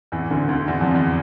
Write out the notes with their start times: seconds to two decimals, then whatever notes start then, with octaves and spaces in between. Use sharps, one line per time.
0.12 E2 E3
0.30 D2 D3
0.48 D2 D3
0.67 E2 E3
0.81 F2 F3
0.95 E2 E3